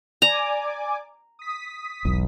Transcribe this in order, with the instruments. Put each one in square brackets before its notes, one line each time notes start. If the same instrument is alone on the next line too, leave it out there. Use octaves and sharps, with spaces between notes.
[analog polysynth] D5 G#5 D6 [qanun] A#5
[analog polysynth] D#6 B6
[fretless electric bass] E1 B1